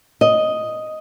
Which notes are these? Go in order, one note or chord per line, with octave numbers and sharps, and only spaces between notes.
D#5